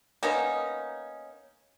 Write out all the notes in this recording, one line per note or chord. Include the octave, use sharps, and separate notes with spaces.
A#3 B3 C#4 D#4